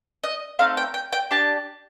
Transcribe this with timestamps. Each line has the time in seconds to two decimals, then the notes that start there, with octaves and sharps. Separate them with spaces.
0.23 D#5
0.59 A3 C4 D#4 F5
0.77 G5
0.94 G5
1.12 G5
1.31 D4 G4 A5